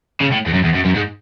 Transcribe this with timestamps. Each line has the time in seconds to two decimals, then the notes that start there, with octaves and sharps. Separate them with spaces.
0.21 C#3
0.32 A2
0.46 E2
0.54 F#2
0.64 E2
0.74 F#2
0.85 F#2
0.95 G#2